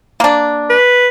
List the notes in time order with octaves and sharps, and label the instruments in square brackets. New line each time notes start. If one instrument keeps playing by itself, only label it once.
[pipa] A#3 D4
[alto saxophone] B4